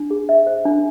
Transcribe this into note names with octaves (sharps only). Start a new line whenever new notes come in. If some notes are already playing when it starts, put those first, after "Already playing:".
Already playing: D4
G#4
E5
C5
D4